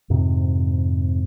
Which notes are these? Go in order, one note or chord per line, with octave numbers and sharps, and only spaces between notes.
F2 G#2 C3